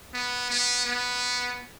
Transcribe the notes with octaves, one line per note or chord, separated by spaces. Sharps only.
B3
B3
B3